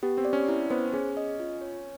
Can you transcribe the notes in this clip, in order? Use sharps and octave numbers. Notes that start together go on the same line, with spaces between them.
B3 G4
C4
D5
C#4
E4
B3 C5
C#4 G#4
D#5
F4
C#5